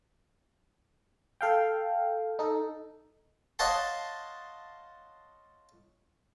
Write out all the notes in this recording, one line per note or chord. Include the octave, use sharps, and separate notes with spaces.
A4 F5 G5
D#4 A4
C#5 D#5 F5 F#5 A5 C6